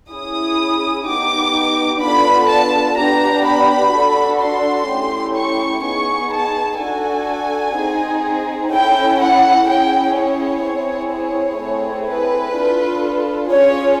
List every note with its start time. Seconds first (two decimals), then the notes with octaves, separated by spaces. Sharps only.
0.10 C#4 E4 G#4 D#6
1.06 B3 D#4 G4 D6
2.01 B3 D4 F4 A4 B5
2.49 A5
2.97 B3 D4 G4 A#5
3.46 B5
3.94 D4 F#4 A4
4.41 C6
4.89 A3 C#4 E4 G4
5.37 C#6
5.85 B3 D#4 G#4 C#6
6.32 A5
6.81 D4 F#4 A4 G#5
7.75 C4 D#4 G#4
8.71 C#4 E4 A4 G5
9.19 F#5
9.67 C#4 E4 G#4 G5
10.16 C#5
10.63 C4 E4 G#4
11.11 C#5
11.59 A3 C4 E4 G#4
12.07 B4
12.55 D4 F4 A4
13.51 C#4 F4 G#4 C#5